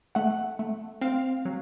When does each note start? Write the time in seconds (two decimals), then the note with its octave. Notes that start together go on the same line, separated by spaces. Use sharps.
0.15 A3 F#5
0.59 A3
1.01 C4 F5
1.45 F#3